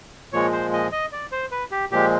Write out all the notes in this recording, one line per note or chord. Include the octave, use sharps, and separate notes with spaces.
A#2 F3 G#3 C#5
C5
D#5
D#5
D5
C5
B4
G4
A#2 F3 G#3 G4